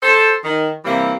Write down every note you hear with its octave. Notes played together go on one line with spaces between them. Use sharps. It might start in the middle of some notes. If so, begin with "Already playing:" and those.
A4 C5
D#3
C3 E3 G3 A#3 E4